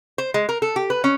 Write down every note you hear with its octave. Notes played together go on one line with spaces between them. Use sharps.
C5
G#3
A#4
A4
G4
B4
C#4